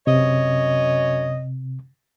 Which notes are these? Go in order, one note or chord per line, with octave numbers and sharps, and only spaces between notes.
F#2 C3 C#5 D#5